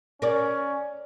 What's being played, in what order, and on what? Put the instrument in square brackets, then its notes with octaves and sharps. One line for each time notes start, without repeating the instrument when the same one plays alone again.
[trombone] C#4 [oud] A#4 D5